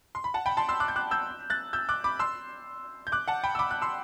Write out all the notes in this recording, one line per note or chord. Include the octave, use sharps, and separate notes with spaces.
C6
B5
F#5 A5
G5 B5
A5 C6
C6 E6
D6 F#6
G6
D6 F#6
E6 G6
F#6 A6
E6 G6
D6 F#6
B5 D6
C6 E6
G6
D6 F#6
F#5 A5
G5 B5
E6
B5 D6
F#6
C6 E6